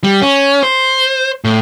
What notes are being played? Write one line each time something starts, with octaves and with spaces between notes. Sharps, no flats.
G3
C#4
C5
A2